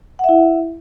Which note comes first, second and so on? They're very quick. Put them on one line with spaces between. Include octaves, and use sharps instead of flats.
F#5 E5 E4